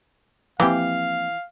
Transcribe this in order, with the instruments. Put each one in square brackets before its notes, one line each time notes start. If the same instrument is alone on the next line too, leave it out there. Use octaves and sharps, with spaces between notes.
[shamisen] E3 G4 [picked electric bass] F3 A#3 C4 [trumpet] F5